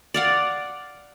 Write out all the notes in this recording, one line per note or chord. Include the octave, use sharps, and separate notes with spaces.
D5 F5 F#5